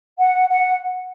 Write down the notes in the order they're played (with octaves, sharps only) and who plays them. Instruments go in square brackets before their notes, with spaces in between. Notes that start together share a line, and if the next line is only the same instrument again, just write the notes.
[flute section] F#5
F#5